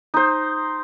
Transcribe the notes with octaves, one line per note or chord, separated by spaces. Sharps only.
D#4 C5